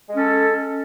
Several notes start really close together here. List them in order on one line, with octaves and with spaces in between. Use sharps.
G#3 C#4 A4